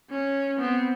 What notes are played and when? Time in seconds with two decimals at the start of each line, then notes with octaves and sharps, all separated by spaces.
0.10 C#4
0.58 B3 C4